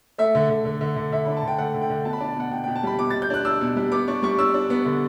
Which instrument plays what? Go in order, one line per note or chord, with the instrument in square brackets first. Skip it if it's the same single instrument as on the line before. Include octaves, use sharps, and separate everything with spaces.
[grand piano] A3 E5
D3
D3
D3
D3
D3
D3 E5
D4 B5
A5
D3 G5
A3 F#5
D3
G5
D3
B2 A5
B5
A5
D4
A5
B2 F#5
B2 G5
B2 G5
A5
G3 B5
B2 D6
B2 A6
G6
D4 F#6
D4 E6
B2
G3
B3 D6
D4 C#6
G3 C#6
D4 E6
D4
B3
D3